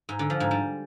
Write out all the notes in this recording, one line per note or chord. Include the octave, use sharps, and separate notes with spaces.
G#2
D3
F3
G#2
G3